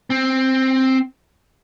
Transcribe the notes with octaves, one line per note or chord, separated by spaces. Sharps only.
C4